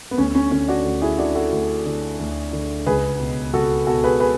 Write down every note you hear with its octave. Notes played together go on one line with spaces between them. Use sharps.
B3
D2 C#4
C#4
D3 C#4
D4 F#4
D2
E4 G#4
D3 D4 F#4
F#4 A4
D2
D3
D2
D3
C#2 G#4 B4
B2
C#2 F#4 A4
B2 F#4 A4
G#4 B4
G#4 B4